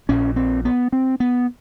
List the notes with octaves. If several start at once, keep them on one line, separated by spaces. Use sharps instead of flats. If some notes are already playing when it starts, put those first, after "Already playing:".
A#1 A#2 C#4
C4
B3
C4
B3